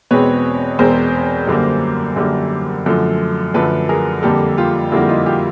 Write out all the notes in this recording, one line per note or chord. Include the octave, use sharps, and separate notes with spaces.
E2 B2 G#3 C4 B4 C#5
E2 B2 G#3 C4 A#4 C5
F#2 D3 G3 A#3
F#2 D3 G3 A#3
F#2 D3 F3 A3
F#2 D3 F3 A3 A4 B4
G#4 A#4
F2 D3 G3 A#3 G4 A4
F4 G4
F2 D3 G3 A#3 E4 F#4
D#4 F4
F4 G4